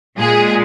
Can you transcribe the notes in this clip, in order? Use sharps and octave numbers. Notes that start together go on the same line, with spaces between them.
A#2 G#3 G#4